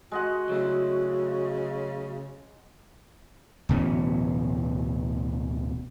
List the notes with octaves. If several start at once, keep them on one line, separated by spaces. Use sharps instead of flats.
G#3 F#4 D#5 F#5
C#3 F#3 A3
D1 B2 E3 C#4